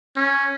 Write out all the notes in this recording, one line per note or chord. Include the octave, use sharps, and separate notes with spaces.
C#4